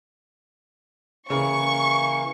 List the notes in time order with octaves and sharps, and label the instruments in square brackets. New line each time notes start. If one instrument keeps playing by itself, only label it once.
[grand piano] C#3 [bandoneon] E3 A#3 [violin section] C#6